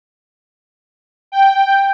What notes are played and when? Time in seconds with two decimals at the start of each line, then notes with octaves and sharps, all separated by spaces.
1.32 G5